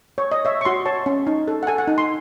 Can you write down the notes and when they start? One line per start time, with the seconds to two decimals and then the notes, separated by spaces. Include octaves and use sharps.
0.18 C#5
0.32 D#5
0.45 C#5 E5
0.61 C#6
0.65 F#4 C6
0.86 C#5 A5
1.06 C#4
1.27 D#4
1.48 A4
1.63 F#5
1.67 A4 G#5
1.78 F#5
1.88 D#4
1.98 C6